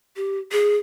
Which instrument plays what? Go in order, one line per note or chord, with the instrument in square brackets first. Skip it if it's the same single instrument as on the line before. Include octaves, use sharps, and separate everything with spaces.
[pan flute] G4
G#4